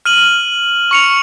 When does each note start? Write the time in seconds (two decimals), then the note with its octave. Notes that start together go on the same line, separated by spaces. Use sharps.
0.05 F6 D#7 F#7
0.91 C#6 C#7 F7